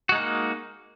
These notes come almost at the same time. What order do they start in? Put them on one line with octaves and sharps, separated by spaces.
F#4 G#3 D#4 A#3